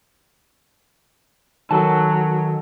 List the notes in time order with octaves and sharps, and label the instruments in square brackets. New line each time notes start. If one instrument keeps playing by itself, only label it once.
[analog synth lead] D#3 [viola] F#3 [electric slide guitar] A4 G#5 A5